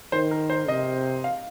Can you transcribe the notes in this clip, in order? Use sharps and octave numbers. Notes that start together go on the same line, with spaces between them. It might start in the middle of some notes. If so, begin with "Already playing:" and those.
D#3 C5
A#4
C5
C3 D#5
F5